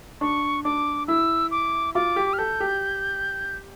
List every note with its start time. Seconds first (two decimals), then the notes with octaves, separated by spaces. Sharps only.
0.21 D4 C#6
0.64 D4 D6
1.08 E4 E6
1.51 D6
1.95 F4 D6
2.16 G4
2.33 F6
2.38 A4 G6
2.60 G4